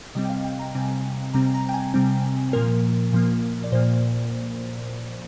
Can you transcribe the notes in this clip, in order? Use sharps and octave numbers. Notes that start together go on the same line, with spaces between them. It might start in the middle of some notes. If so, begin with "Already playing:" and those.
C3 G3 C4 D#5
G5
F5
G5
A#5
C3 G3 C4 G#5
C3 G3 C4 A#5
A#5
G5
G#5
C3 G3 C4
A#2 F3 A#3 A#4
A#2 F3 A#3
D5
A#2 F3 A#3 C5